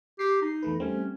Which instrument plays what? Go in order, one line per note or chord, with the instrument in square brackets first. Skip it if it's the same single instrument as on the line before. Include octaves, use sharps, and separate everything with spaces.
[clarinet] G4 [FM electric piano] C7
[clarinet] D#4
[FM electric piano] E2 A3 B4
[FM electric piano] G3 A3 C4 [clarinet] C#4